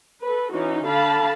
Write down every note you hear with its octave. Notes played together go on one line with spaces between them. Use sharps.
A4 B4
E3 C#4 D#4 F#4
D3 F5 A5 B5